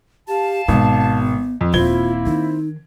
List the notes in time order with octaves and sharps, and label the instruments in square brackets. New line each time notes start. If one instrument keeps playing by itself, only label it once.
[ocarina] G4 [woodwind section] F5 A5
[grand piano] G#1 [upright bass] B2 G#3 [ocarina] B3
[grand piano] F2
[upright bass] D#1 [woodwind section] A#3 E4 [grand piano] C4 G#6 G7 [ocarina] F4
[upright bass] D#3 [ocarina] D#4